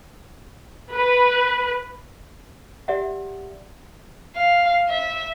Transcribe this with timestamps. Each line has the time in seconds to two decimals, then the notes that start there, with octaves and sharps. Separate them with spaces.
0.92 B4
2.88 G4 D5 E5 F#5
4.35 F5
4.89 E5